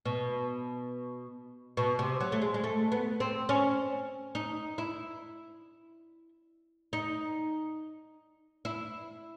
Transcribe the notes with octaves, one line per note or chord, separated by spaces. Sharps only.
B2
B2
C3
F#3
A3
G#3
G#3
A3
B3
C4
C#4
D#4
E4
D#4
E4